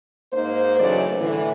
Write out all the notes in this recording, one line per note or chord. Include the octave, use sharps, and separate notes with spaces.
G#2 A#3 D#4 C5
F#2 C#3 E3 F#3 A3 D5
A2 D3 E3